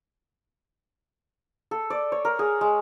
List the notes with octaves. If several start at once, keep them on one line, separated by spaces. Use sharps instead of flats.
A4
D5
C#5
A#4
G#4
G#3